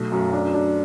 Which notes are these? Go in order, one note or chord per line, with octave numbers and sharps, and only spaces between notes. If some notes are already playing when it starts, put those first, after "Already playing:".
Already playing: B1 A3
F#2
D4
D4